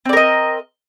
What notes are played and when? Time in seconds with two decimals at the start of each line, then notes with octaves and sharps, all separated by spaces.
0.05 C4
0.09 D5
0.13 A#4
0.17 D#5